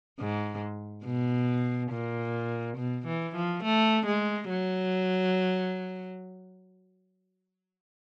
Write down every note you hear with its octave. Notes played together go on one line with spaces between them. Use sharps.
G#2
B2
A#2
B2
E3
F3
A3
G#3
F#3